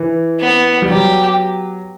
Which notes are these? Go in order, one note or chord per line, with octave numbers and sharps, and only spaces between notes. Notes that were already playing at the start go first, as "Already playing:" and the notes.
Already playing: E3
B3
G3
F#3 G4